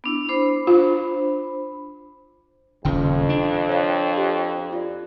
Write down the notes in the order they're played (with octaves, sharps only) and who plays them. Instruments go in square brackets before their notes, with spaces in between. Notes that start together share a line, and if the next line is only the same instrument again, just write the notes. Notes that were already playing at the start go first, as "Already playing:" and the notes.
[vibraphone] B3 D4 E4
D4 C5 B5
[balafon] F4
[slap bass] D#1 C#3 [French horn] F2 [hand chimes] G5
[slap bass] D4
[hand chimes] C#5 F5
G4
F4 D5